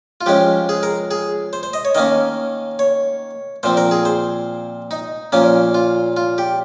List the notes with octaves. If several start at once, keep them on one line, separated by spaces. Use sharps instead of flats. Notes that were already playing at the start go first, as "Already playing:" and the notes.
F4
F3 G#3 C#4 G4
G#4
A#4
G#4
C5
C5
D#5
C#5
D#3 A#3 C#4 D#5
C#5
A#2 F3 C4 C5
A#4
G#4
C5
D#4
A#2 F3 A#3 C#4
F4
F4
G4